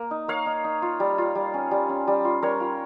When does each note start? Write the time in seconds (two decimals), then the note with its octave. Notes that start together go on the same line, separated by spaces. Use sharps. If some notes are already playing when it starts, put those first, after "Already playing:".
Already playing: A#3
0.11 D#4
0.28 A#3 C#5 F5
0.46 D#4
0.64 D#4
0.82 F4
1.00 G3
1.18 F4
1.35 G3
1.54 C#4
1.71 G3
1.89 C#4
2.07 G3
2.25 F4
2.42 G3 A#4 C#5
2.60 F4